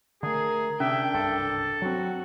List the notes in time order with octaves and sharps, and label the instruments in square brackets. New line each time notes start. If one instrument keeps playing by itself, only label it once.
[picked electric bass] D3 A3 [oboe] G#4 [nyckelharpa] A#4
[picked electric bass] C3 [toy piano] C#4 [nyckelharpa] D4 G5 [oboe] E5
[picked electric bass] F#1 C2 G2 [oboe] A4
[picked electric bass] F#3 C4 [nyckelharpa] F#4